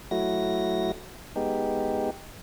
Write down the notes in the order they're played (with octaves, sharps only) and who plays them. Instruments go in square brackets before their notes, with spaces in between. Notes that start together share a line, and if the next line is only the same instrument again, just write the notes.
[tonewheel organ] F#3 A3 E4 F#4 A#6
G#3 B3 D#4 G4